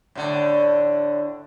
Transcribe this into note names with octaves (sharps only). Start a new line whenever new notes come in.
A2 D3